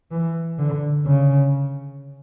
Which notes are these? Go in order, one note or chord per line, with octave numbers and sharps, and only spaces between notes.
E3
D3
C#3